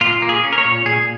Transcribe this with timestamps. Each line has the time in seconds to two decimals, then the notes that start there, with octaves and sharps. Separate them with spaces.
0.01 A#2 F4
0.22 A#3
0.29 G#4
0.44 C#4
0.52 A#4
0.58 C#5
0.65 A#2
0.86 A#2 G#4